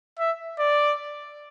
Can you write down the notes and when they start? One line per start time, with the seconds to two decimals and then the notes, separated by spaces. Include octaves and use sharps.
0.19 E5
0.59 D5